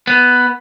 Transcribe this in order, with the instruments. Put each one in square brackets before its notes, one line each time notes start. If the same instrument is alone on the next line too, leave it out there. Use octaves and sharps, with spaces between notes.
[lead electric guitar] B3